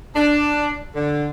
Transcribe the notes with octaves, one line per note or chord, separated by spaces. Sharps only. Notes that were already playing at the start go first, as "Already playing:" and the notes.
D4
D3